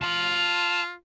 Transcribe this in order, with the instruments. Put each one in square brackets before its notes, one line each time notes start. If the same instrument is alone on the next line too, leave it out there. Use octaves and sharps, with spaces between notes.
[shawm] F4 [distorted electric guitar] A5 C6